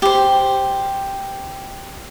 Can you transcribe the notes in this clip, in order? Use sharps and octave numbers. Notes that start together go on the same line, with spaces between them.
G4 C5